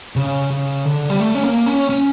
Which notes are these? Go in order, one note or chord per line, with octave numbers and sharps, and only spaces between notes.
C#3
C#3
D3
G3
A3
C#4
A#3
C#4
C#4